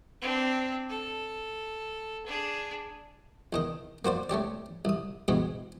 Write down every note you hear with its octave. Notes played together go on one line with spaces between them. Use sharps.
C4 D4
A4
D4 G#4
E2 D#3 D#5
A#3 F#4 C5 D5
A3 C#4 G4 D5
C2 D#6
B2 E3 G#3 B3 C4